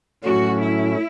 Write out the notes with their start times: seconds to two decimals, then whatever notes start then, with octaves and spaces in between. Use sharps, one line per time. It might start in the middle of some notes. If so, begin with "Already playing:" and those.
0.24 A2 F#3 A3 C#4 F#4
0.60 E4